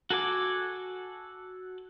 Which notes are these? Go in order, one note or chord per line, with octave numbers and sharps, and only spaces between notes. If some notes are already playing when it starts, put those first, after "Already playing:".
F#4 A4 G#5 D6